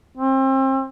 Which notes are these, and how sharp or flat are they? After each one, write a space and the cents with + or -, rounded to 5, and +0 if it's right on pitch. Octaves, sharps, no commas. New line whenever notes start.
C4 +35